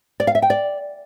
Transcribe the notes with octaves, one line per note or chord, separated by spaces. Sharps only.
D5
F5
E5
G5
D5